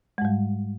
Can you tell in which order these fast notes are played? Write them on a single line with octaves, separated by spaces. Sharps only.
G#3 G#2 G3